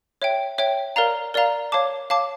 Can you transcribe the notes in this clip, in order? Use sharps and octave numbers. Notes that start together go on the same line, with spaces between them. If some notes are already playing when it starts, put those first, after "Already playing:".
C#5 E5 G5
C#5 E5 G5
A#4 D5 F5 A#5
A#4 D5 F5 A#5
C#5 F5 A5 D6
C#5 F5 A5 D6